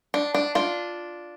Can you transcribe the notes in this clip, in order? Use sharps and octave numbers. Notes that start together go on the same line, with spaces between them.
D4
D4
D4 F4